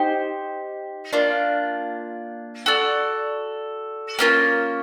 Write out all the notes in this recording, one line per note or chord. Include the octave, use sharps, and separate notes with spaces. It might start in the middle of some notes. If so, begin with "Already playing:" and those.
Already playing: D#4 G4 C5
A#3 D4 F4
F#4 A4 D5
A#3 C#4 F4 A#4